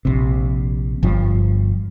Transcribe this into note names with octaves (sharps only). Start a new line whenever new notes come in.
A#1 C3
G1 G2 F3